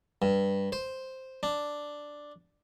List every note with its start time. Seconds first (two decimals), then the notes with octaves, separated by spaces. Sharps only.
0.22 G2
0.72 C5
1.43 D4